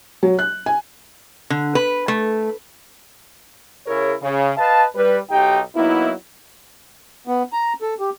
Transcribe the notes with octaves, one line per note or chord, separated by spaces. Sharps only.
F#3
F#6
G#5
D3
B4
A3
C#3 E4 G#4 A#4 C#5
C#3
B4 D#5 F5 A5
G3 B4
B1 D#4 G4 G5
F#3 A#3 B3 D#4 E4
B3
A#5
A4
G4